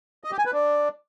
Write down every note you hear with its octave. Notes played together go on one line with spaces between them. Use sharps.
D#5
G4
G#5
B4
D4